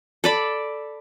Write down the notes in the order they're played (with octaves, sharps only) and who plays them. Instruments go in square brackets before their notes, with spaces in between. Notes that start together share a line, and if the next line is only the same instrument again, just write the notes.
[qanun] A4 D5 B5